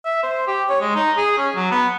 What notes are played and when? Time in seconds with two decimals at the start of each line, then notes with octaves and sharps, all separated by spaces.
0.04 E5
0.23 C5
0.47 G4
0.69 C#5
0.81 G#3
0.95 D#4
1.17 G#4
1.37 C#4
1.55 F#3
1.71 B3